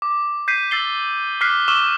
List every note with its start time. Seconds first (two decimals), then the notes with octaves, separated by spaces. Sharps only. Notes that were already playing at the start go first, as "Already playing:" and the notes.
0.02 D6
0.48 G6 B6 C7 D#7
0.71 E6 A6 C7 G7
1.41 D6 F6 F#6 B6 C7 G7
1.68 C#6 D6 E6 F6 E7 G7